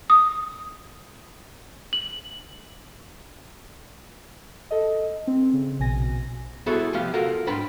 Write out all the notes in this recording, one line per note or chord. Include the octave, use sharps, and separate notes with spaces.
D#6
F#7
A4 D#5
C4
C#3
A#1 B2 G#5 A#6
B3 E4 F#4 G#4 A4 C5
C2 F3 B3 G4 F5
F4 F#4 A4 A#4 F5 F#5
G#2 D4 B4 G5 B5 C6